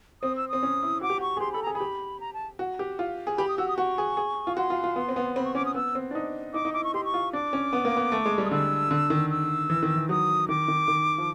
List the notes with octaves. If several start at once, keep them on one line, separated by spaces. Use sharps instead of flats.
C4 D#6
E6
C4 D#6
C#4
E4
F#4 D6
G4
F#4 C#6
G#4
G4 C6
A4 B5
G#4 A#5
G#4 B5
G4
A#5
A5
F#4
G4
F4
G#4
G4 B5
D#6
F#4 E6
D#6
F#4 C#6
G#4
G#4
F4
F#4 C6
F4
F4
B3
C4
B3
C4 B5
C#6
C#4 D6
D#6
B3 E6
C4
D4
D#4
D#4 D6
D#4
E4 D6
C#6
G4 C6
C#6
F4
D4 D6
C#4
B3
A#3
B3
A3
G#3
G3
D#6
D3 E6
D3
D#3
E6
E3
D#3
E3
F#3 D#6
D#3 D6
D#3
D#3
F3